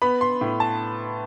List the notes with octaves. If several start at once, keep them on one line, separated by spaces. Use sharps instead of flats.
B3 B5
C6
A2
A5